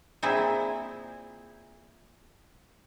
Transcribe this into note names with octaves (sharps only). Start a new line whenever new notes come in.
A#2 C4 E4 G#4